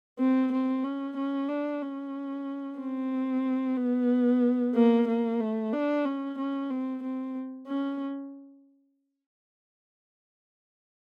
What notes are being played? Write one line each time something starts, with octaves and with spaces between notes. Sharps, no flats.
C4
C4
C#4
C#4
D4
C#4
C4
B3
A#3
A#3
A3
D4
C#4
C#4
C4
C4
C#4